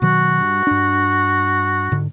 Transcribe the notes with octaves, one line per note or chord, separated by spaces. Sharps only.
B2 D#3 F#3 F#4
G2
G2 D4
G#2 D3